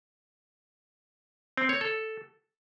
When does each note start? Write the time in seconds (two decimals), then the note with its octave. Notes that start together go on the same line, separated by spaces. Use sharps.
1.58 C4
1.69 C#5
1.81 A4